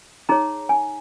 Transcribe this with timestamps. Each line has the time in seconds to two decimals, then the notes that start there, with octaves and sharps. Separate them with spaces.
0.29 D#4 G#4 C#5 A#5
0.69 G#5